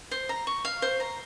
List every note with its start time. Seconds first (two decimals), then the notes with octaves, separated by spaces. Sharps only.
0.11 C5
0.29 A#5
0.47 C#6
0.65 F5
0.82 C5
1.00 A#5